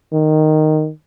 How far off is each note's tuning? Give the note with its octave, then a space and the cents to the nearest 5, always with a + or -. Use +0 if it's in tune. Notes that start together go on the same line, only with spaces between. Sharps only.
D#3 -5